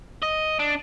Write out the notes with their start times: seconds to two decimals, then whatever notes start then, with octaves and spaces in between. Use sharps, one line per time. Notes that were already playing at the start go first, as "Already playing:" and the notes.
0.23 D#5
0.59 D4